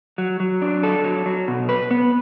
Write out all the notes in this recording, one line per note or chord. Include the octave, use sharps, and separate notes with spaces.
F#3
F#3
D4
A4
F#3
F#3
B2
B4
B3